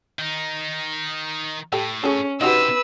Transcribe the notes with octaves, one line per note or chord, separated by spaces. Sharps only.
D#3 D#4
A2 G4 A4
C#4 G#4 A4
C3 D#4 F#4 G4 B4 E6